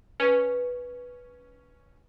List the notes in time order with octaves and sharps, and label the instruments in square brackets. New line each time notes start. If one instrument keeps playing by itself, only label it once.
[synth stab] C#4 [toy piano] B4